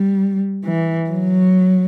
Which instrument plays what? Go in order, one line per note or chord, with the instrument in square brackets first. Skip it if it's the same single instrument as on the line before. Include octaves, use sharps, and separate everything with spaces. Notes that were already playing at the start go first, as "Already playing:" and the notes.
Already playing: [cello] G3
E3
F#3